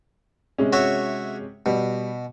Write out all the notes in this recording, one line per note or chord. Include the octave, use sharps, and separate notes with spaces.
C3 G#3 C#4
F#4 C#5 E5
B2 G3